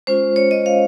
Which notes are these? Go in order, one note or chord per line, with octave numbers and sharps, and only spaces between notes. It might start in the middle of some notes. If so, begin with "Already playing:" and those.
G#3 C#4 F4 C5
C#5
D#5
F5